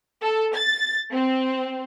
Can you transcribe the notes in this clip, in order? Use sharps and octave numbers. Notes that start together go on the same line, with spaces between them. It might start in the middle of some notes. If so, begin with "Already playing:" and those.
A4
A6
C4